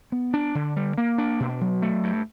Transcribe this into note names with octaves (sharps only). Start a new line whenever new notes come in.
B3
D4
D3
G3
A#3
D4
B2
F#3
A3
G2